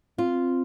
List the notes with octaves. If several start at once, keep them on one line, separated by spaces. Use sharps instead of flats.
C4 F4